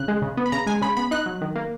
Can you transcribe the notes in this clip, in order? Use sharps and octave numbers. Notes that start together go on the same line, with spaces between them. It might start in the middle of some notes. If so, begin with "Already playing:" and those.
Already playing: C#3 F#6
G#3
C#3
B3
B5
C#3 A#5
G#3 G#5
C#3 B5
B3 B5
D#4 F#6
F#3
D#3
A#3